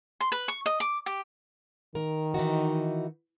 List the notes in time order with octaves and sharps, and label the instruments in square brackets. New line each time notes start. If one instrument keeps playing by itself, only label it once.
[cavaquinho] C6
B4
C#6
D#5
D6
G4
[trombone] D#3 [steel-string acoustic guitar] A#4
[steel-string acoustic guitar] E3 D#4 F#4